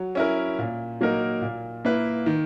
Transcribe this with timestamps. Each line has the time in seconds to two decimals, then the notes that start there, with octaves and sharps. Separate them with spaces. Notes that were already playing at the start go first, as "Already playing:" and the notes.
Already playing: F#3
0.15 C#4 E4 A#4
0.59 A#2
1.01 F#3 A#3 D#4 A#4
1.41 A#2
1.85 A#3 E4 B4
2.26 D#3